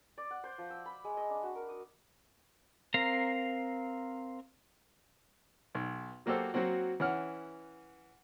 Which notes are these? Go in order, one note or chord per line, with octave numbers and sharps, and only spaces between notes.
D5
F#5
C5
F3
E6
B5
G#3
D#5
D4
F#4
A#4
D#6
C4 A#4 F5 A#5
B1
F#3 A#3 F#4 G4 A4 C5
F#3 A#3 C4 F#4
E3 C#4 F#5 F6